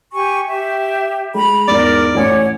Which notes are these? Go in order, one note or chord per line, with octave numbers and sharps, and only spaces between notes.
G4 G#5 C#6
G4 E5
G#3 A#5 B5
E2 G#2 A#4 D5
A1 C#5 F#5 G#5 D6